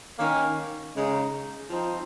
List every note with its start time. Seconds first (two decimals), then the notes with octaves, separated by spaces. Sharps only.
0.19 D#3 A#3 C#4
0.95 C#3 G#3 D#4
1.70 F3 C4 D#4